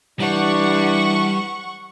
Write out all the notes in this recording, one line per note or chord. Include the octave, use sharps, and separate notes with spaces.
E3 G3 D4 F#5 C#6